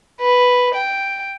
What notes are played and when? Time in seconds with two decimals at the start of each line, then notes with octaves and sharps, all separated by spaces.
0.22 B4
0.74 G5